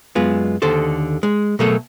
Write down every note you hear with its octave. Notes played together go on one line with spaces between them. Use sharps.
F#2 G#3 B3 F4
D#2 D3 A4 C5
G#3
B2 F#3 A3 A#3 G#4 A4